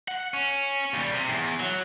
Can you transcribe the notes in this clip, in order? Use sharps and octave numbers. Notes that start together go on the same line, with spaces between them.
F#5
C#4
D#2 G3
C3
E2
F#3